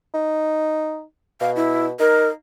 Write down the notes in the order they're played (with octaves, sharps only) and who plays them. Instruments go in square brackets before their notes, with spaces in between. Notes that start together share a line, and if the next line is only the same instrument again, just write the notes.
[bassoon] D#4
[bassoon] B2 [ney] F5
[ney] E4
[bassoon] D#4 [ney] A#4